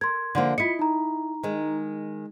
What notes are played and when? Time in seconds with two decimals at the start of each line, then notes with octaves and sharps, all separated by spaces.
0.01 A#4 C6 G#6
0.35 D3 F3 A#3
0.58 E4 F4 D#5 B6 C#7
0.79 D#4 A#5
1.43 D#3 G#3